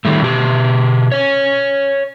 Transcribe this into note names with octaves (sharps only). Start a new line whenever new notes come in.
D#3 G3 A3
B2 G4
C#5 G#5